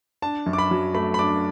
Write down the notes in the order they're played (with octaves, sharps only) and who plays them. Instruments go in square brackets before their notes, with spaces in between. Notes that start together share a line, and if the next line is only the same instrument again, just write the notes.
[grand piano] D4 A5
F#2
D6
B5
F#3
A3 B5
B5
D4 D6